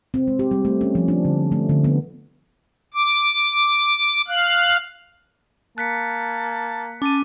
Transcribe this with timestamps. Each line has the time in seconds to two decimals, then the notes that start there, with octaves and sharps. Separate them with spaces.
0.14 C4
0.28 G#3
0.39 G4
0.51 G3
0.65 A3
0.81 C#4
0.95 F3
1.08 D4
1.25 D3
1.52 A3
1.69 D3
1.84 B3
2.94 D6
4.28 F5 F#6
5.78 A#3 A5 F#6 B6 C#7
7.02 C#4 A5 D6 D#7